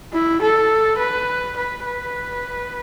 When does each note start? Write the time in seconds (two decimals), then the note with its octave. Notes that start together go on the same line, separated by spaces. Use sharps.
0.13 E4
0.42 A4
0.99 B4
1.56 B4
1.86 B4